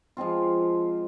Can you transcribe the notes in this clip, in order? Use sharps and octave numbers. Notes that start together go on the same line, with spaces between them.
F3 G#3 C4 F4